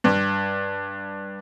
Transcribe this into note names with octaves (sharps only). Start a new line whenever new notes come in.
G2